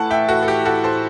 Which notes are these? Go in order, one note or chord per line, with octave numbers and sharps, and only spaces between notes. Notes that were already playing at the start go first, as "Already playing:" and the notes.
Already playing: A2 E3 F#5 A5
E5 G5
F#4 A4
A4
G4
F#4 A4
A4 C5